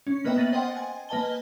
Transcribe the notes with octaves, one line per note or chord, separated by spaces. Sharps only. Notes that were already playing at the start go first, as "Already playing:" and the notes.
C#4
A#3 B3 B4 D#5 E5 G5
A#3 A6 D#7 F#7
C5 D#5 F#5 G5 C6 A6
G#5
A#3 B4 D#5 G#5 A5 G7